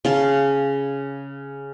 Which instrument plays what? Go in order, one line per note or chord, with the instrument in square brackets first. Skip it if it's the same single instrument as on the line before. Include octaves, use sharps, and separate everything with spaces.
[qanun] C#3 F5 A5